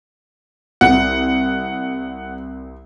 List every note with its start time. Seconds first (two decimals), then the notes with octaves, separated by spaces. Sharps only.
0.81 C2 F#5